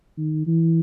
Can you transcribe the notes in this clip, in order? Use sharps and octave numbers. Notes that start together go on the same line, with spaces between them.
D#3
E3